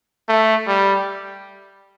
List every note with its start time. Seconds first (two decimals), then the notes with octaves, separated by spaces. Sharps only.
0.29 A3
0.67 G3